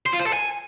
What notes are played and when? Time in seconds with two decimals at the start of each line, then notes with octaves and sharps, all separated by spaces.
0.06 C5
0.13 F4
0.20 C5
0.26 A4
0.33 G#5